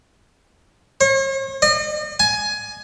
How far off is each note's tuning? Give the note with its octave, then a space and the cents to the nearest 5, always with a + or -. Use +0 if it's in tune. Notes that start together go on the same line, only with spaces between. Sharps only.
C#5 -45
D#5 -40
G#5 +15